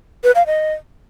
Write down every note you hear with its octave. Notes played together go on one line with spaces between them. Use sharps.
B4
F5
D#5